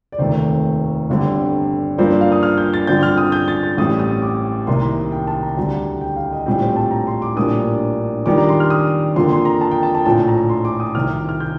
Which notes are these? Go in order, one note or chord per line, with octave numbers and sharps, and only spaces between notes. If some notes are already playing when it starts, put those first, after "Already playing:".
D5
F1 D#2 D#3 A3 C4 C5
G1 G2 D3 G3 C4
G2 F3 A#3 D4 C5
D5
F5
D#6
F6
G6
A6
G2 D3 F3 C4 G6
F6
D#6
G6
A6
G6
A1 A2 G3 C4 D#6
D#6
D6
C2 C3 D#3 G3 A#3 C6
A#5
G5
A5
A#5
D2 D3 G3 A#5
G5
F5
D#5
A#1 A2 G3 C4 C5
C5
A5
A#5
C6
D6
A#1 A2 G3 A#3 D4 D#6
F2 D#3 G3 D4 D6
A#5
C6
F6
D#6
F2 D3 F3 A#3 C6
C6
A#5
A5
G5
A5
A5
A#1 A2 F3 A5
A#5
C6
D6
D#6
C2 C3 D#3 F6
F6
G6